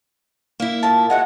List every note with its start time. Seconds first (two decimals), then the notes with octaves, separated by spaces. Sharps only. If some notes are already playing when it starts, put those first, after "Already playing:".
0.60 A#3 E4
0.83 A2 F4 A5
1.10 G#3 A3 F#4 F#5